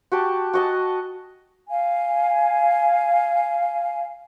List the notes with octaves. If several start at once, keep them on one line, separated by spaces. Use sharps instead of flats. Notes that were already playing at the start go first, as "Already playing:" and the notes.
F#4 G4 A5
F#4 D#5 A5
F5 G#5